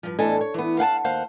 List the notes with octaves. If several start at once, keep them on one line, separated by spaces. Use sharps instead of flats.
G2 F3
E2 A2 D4 A4 D#5 G#5
C#5
E3 B3
F5 F#5 G#5 A5
D#2 C5 F5 F#5